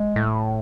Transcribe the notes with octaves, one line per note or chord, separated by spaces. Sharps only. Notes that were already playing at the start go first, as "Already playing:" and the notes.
Already playing: G#3
A2